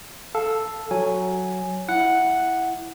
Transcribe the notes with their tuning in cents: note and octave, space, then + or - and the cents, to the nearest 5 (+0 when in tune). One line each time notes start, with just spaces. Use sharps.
A4 +0 F5 +5
F#3 +0 G#5 +0
E4 +0 F#5 +0